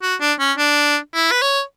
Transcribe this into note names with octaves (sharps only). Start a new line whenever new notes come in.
F#4
D4
C#4
D4
E4
B4
C#5